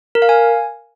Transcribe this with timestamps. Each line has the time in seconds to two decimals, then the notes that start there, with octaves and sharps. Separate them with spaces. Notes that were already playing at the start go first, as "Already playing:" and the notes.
0.15 A#4
0.22 F5
0.29 G#5